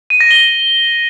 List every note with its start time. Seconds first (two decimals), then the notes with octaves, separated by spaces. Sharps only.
0.10 D#7
0.20 A#6
0.31 G7